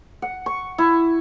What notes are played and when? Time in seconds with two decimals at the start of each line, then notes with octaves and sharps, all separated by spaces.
0.22 F#5
0.46 C#6
0.78 E4